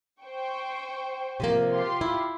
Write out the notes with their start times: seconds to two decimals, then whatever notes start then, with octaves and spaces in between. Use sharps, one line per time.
0.21 C5 G5 C#6
1.40 C3 F3 A#3
1.70 F4 G4 C6
2.01 E4